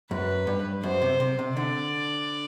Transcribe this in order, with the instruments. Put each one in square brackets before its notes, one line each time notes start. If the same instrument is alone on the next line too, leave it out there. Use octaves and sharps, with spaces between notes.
[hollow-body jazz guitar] F#2 [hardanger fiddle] B4
[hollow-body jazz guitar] G2
[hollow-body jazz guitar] F#2 [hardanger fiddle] C5
[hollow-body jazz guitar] C3
C3
C3
[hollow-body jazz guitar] D3 [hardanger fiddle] D5